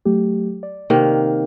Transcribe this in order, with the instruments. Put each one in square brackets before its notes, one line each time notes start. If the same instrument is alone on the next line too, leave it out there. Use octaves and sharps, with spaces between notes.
[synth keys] F#3 A3 G4
D5
[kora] C3 D#3 A#3